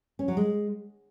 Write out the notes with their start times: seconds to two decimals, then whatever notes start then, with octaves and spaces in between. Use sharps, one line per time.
0.19 C#4
0.28 F#3
0.37 G#3